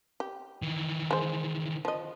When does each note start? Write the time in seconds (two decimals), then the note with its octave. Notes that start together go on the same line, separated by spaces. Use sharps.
0.20 G4
0.62 D#3 E3
1.11 G#3 C5
1.85 F3 D#5